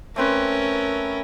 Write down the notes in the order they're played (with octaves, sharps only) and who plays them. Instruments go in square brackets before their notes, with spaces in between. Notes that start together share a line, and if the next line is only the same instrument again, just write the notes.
[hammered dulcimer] A3 C4 B4 [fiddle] C#4 A#4